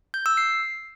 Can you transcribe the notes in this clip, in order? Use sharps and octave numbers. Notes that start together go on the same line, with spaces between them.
G6
E6
C7